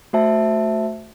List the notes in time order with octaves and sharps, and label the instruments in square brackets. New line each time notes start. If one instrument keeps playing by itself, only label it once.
[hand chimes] A3 F#4 C5 E5 A5